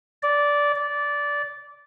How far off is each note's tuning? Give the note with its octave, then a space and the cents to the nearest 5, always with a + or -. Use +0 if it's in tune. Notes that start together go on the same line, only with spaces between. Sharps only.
D5 -15
D5 -15